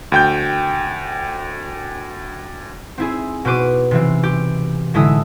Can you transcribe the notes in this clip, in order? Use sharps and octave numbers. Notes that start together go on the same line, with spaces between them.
D2 G5 G6
C4 E4 G#4
B2 B3 B4 C5 D6 D#7
C3 E3 C4
G4
A2 D3 G#3 E4 E5 D#6